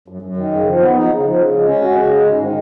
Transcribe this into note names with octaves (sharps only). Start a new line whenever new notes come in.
F#2
F#2
D#3
C#3
F3
B3
D#4
C#3
F3
C#3
G#3
C#4
F#4
C#3
G#3
G#2
D#3